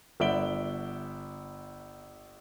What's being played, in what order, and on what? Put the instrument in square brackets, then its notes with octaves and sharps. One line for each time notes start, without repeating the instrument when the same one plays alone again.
[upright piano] G1 D5 E5 F#5 D7 G7